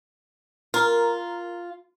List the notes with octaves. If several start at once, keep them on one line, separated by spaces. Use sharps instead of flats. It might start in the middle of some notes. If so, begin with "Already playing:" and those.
F4 A#4